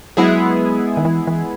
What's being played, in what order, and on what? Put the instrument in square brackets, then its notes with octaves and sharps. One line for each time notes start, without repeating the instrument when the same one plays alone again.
[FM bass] F#3 [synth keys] G#3 B3 E4 G#4
[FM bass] D#3
E3
E3